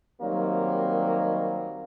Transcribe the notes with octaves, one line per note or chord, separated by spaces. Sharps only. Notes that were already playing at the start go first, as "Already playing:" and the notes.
D#3 F#3 G3 A#3 C4 D#4